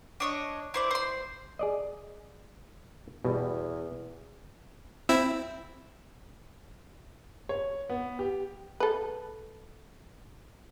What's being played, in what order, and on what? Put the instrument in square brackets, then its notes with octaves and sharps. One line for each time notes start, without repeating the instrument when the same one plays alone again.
[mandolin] D4 C#5 D#5
E4 C5 D5
C5 C6
[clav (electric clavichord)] G#4 D5 D#5
[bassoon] E2 [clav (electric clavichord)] B2 G3
[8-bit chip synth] C4 E4 E6
[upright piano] C#5
B3
G4
[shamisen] A4 B4